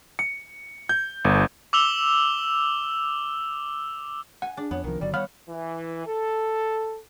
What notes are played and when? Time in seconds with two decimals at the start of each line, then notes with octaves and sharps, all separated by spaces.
0.19 C#7
0.89 G6
1.25 G1
1.73 D6 E6 F7 G7
4.42 F#5 G#5
4.57 D4 G#4
4.71 F2 B3 C#5
4.84 C2 D#3 F3 A#4
5.01 G1 D3 F#3 G3 D5
5.14 G3 B3 C#5 F5 B5 F6
5.49 E3
6.07 A4